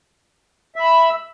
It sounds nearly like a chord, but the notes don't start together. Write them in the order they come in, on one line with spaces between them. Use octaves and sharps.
E5 B5 E6